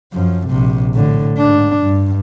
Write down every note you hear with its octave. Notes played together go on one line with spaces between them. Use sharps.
F#2 F3
A#1 C3
A2 D3
G#2 D4
G2